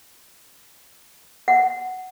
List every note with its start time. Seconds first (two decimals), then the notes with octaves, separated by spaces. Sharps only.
1.48 F#5